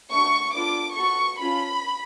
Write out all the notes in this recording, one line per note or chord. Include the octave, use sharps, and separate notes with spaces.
A3 D4 F#4 C#6
B3 D4 F4 A4 D6
B3 F#4 A4 C#6
C#4 F4 A4 B5